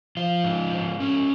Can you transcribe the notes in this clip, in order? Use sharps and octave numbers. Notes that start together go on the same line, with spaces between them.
F3 F4
G#2
G#2
C#4